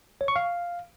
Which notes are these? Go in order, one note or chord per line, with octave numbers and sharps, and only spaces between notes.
C#5
C#6
F5